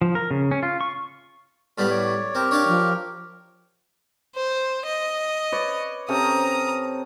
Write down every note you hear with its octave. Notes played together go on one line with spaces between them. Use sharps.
F3
A#4
C#3
C#4
F4
C#6
A2 G3 B3 F6
C#5 D5
C4 G4 A#4
D4 C#5 D5 F5
F3
C5
D#5
B4 C#5 D5
C3 C#4 A4 A#5 D#6